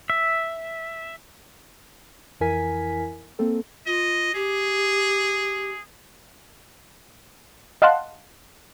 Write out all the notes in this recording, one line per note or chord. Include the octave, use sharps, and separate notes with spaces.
E5
F2 E3 E4 A#4 G#5 B6
A#3 C4 A4
F4 D#5
G4 G#4
D#5 F5 F#5 A5 C6 F#6